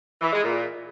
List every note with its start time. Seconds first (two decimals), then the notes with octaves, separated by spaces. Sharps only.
0.21 E3
0.32 G#3
0.43 A#2